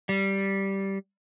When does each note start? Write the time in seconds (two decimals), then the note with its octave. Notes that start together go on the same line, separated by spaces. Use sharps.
0.09 G3